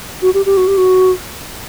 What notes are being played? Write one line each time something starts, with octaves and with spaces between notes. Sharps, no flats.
F#4
G4
G4
F#4
G4
F#4